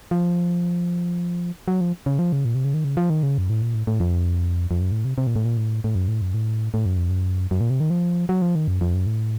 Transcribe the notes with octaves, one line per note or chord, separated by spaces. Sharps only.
F3
F#3
F3
C#3
F3
C#3
A#2
C3
C#3
D#3
C#3
F3
D#3
C#3
F#2
A2
A#2
A2
A2
F2
F2
F#2
A2
C3
C3
A#2
A2
A#2
A2
A2
F#2
A2
F#2
A2
A2
F#2
F2
F#2
F#2
A#2
C3
D#3
F3
F#3
F3
D#3
F#2
F2
F#2
A2